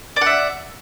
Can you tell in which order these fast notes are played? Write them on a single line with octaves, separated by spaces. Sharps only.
D5 F#5 E5